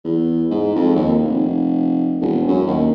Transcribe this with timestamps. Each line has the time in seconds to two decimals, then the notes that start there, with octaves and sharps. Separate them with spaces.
0.04 E2
0.51 G#2
0.75 F2
0.96 D#2
1.24 F1
2.21 E1
2.48 F#2
2.67 D#2